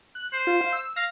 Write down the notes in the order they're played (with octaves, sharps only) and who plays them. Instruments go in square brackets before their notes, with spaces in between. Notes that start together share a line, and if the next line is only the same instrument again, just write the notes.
[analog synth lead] F#6
[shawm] C5
[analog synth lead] F4
F5
E6
[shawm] F5 [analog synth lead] A#6